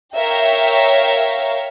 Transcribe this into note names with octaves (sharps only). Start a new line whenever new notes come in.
A#4 C#5 E5 F5 G5